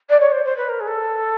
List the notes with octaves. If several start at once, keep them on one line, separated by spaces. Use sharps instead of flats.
D5
C#5
C5
C5
B4
A#4
G#4
A4